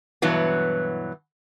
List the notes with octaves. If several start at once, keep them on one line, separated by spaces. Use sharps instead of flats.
G2 B2 E3 F#3 B3